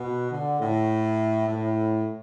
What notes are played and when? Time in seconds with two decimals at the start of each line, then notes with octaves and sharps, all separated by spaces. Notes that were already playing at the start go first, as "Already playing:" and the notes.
Already playing: B2
0.31 D3
0.60 A2
1.48 A2